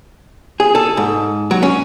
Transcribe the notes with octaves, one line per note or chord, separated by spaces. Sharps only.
G#4
A4
G#2
F#3
C#4